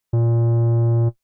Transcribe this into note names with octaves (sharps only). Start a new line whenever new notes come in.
A#2